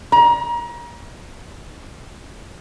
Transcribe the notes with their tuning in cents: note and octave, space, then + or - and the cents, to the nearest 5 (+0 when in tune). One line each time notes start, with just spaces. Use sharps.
A#5 +30